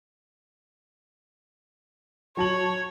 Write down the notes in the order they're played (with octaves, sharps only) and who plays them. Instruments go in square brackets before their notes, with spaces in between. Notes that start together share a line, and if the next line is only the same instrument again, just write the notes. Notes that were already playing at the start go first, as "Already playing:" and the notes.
[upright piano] F#3 A5 F#7 [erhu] C#5